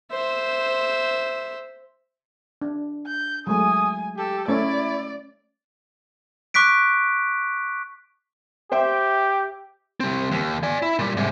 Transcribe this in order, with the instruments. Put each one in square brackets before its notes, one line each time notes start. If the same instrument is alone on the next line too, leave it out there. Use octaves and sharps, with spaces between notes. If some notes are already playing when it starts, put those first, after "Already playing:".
[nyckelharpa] C5 E5
[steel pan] D4
[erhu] G6
[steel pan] F#3 G#3 A3 [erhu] G#5 [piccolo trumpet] D#6
[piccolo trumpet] G4 [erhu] A4
[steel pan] A3 C#4 C#5 [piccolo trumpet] E4 [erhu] D5
[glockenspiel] C#6 D6 F#6 B6 D7
[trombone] G4 [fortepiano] C5 E5 G5
[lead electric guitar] G3 C4
D#2
D5 G#5
E4
A#2 G3
G#2 C3